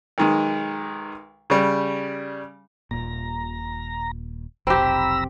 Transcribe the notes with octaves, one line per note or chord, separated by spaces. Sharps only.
B1 D#3 G#3
C#3 G3
D#1 A#2 A#5
F1 B1 C4 G4 A#5 B5 E6